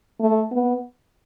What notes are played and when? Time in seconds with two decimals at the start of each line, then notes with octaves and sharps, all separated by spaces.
0.20 A3
0.51 B3